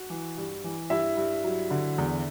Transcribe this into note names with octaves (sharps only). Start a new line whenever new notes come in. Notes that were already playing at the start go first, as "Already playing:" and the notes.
Already playing: F#4
E3
G2
E3
G2 E4 E5
G2
F#3
D3
E2